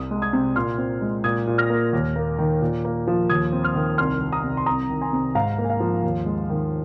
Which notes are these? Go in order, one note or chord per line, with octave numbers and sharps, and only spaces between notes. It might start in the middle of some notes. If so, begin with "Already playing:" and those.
Already playing: C2 C3 D#6
G#3
D#6 G#6
C3
A#2 C6 F6
C4
G#3
A#2 D#6 G#6
A#2
F6 A#6
A#3
D#2
A#3
D#3
A#2
A#3
F3
D#2 D#6 G#6
C4
C6 F6
D#3
C2 C6 F6
D#3
A#5 D#6
C3
C6
C2 A#5 D#6
D#3
G#5 C6
C3
G#2 F5 A#5
A#3
G#5
F5
F3
D#2
G#3
D#3